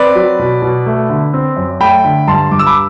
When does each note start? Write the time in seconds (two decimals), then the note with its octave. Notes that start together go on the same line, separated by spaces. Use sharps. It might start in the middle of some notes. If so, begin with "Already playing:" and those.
Already playing: C4 B4 D5
0.15 F#3
0.39 B2
0.62 B2
0.86 A3
1.10 D3
1.33 C4
1.57 F#2
1.80 A3 G5 B5
2.04 D3
2.28 G2 A5 C6
2.51 G2 D6
2.59 E6
2.67 B5 D6